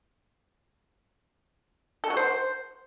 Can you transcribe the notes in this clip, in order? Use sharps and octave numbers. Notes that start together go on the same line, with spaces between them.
A4
F#4
C5